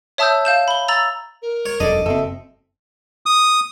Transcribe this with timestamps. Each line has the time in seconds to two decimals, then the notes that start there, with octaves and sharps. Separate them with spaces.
0.18 C#5 E5 A5 D#6 E6 G6
0.45 F5 G6 E7
0.68 B5 G7
0.88 A#5 E6 A6 F7 F#7
1.42 A#4
1.66 C#5
1.80 E1 F#2 D4 A4 D5 D#5
2.06 F#1 C4 A4 E5
3.26 D#6